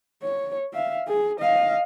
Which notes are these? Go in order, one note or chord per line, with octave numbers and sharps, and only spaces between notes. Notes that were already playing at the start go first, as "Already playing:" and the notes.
C#5
E5 F5
G#4
D#5 F5